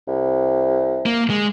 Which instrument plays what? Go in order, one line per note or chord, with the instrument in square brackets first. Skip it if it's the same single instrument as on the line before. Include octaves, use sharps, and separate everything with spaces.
[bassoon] C2
[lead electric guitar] A#3
G#3